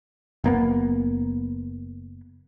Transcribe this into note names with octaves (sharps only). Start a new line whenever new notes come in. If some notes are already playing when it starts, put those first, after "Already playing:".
F#1 A#3 B3